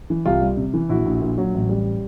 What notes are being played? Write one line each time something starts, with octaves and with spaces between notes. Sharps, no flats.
E3
C2 F4 G4
G3
C3
E3
A#1 E4 F#4
A#1
A#2
F#3
A1
G3